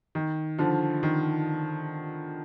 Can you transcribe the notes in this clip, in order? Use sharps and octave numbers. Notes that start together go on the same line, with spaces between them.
D#3
D3 F3
D#3